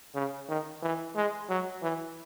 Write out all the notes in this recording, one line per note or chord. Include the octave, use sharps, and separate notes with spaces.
C#3
D#3
E3
G#3
F#3
E3